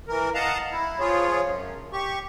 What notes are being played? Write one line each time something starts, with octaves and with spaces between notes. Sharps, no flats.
E3 A#4
D#5 F5 F#5 A5 A#5
E4
F3 F4 G#4 C#5
F#2
G4 C#6